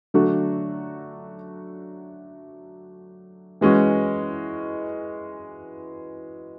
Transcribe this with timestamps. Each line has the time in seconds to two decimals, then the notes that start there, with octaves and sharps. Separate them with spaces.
0.14 D3 F#3 A3 D4 F#4
3.61 E3 G#3 C#4 F#4